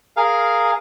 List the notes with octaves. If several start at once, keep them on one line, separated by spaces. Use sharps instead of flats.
G#4 A#4 F5